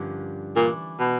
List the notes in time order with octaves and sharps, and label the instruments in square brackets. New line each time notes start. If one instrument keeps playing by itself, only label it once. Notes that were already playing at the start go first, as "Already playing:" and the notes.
Already playing: [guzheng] G2 D3 F3 A#3 C#4
[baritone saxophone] A#2 [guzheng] E3 A3 D4
[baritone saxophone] B2